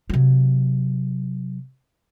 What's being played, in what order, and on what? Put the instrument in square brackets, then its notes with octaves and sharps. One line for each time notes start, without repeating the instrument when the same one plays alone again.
[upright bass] C3 F#3